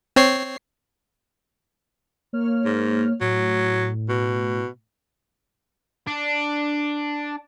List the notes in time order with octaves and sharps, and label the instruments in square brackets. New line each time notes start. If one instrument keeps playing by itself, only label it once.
[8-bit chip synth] C4 C#5 C7
[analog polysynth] A#3 C#5 F6
[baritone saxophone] G#2
[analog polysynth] A2 [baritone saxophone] F#3
[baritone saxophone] B2
[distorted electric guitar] D4